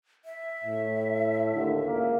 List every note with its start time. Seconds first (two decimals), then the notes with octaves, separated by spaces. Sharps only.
0.25 E5
0.64 A2
1.54 D#2 D3
1.86 C#2 A#3